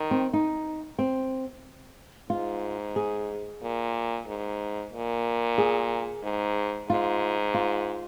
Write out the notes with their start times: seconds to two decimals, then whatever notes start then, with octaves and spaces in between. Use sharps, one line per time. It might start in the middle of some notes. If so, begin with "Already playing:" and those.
Already playing: D#3
0.11 C4
0.33 D#4
0.99 C4
2.30 G#2 F4
2.96 G#4
3.62 A#2
4.27 G#2
4.92 A#2
5.58 G#4
6.23 G#2
6.89 G#2 F4
7.54 F4